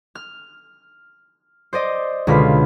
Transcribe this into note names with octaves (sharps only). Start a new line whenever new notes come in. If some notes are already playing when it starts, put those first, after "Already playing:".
F6
C5 D5 D#5
C#2 B2 D3 F4 B5 B6